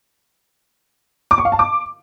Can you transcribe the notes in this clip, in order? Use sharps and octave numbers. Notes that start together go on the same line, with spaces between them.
D6
C#6
F5
A5
D6